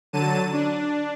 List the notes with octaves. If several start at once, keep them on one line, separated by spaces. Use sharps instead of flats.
D3 F#3 A5 D#7
D4